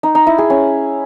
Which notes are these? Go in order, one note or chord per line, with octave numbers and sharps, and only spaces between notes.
D#4
D#4
E4
G#4
C#4